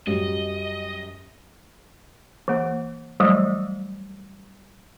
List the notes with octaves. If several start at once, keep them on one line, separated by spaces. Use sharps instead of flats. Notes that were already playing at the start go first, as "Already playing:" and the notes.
F#2 F#3 G3 D#5
E3 A#3
E3 F#3 G3 A3